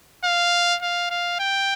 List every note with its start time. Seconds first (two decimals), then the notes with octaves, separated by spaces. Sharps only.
0.24 F5
0.82 F5
1.10 F5
1.40 G5